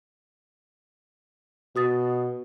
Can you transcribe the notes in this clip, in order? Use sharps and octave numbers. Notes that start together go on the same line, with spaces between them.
B2 F#4 D#6 A6